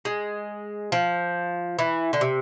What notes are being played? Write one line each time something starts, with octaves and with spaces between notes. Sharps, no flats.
G#3
F3
E3
D3
C3